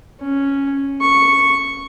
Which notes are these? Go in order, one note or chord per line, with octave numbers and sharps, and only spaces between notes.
C#4
C#6